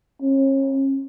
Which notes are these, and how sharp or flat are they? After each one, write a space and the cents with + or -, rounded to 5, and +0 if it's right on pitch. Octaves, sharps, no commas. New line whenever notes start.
C#4 -35